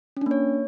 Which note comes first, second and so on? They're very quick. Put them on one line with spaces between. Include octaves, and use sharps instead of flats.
C#4 D4 A#3 C#5